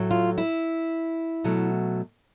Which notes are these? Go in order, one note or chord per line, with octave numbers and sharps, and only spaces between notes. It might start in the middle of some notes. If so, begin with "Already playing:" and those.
Already playing: A2 F#3 A3
F4
E4
B2 F#3 A3